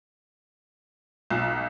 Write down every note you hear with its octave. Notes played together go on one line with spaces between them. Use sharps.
B1